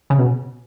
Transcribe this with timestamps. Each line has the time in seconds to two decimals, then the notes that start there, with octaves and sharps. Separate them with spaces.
0.10 C#3
0.19 B2